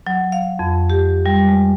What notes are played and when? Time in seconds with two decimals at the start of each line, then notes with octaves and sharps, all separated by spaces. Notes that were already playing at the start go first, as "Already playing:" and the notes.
0.07 F#3
0.32 F5
0.59 F2
0.90 G4
1.26 G3
1.49 G#3